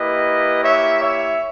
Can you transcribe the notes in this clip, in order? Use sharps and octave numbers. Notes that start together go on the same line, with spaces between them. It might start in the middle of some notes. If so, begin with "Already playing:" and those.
Already playing: A#3 E4 G4 B4 D#5
C#5 E5
C#5 E5